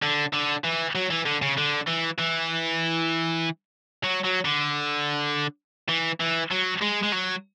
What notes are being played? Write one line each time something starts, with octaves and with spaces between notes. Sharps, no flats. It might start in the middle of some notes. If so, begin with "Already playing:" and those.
D3
D3
E3
F#3
E3
D3
C#3
D3
E3
E3
F#3
F#3
D3
E3
E3
F#3
G#3
G#3
F#3